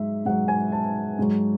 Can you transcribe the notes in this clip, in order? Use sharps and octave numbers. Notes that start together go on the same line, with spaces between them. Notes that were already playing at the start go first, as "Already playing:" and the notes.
Already playing: G#2 F#3 E5
G#2 F#3 F#5
G#5
A5
G#2 F#3